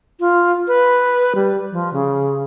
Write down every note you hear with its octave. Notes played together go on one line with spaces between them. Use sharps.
F4
B4
G3
F3
C#3